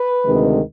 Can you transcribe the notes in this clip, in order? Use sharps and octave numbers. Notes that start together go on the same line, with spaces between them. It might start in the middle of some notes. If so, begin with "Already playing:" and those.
Already playing: B4
D2 C3 D#3 G#3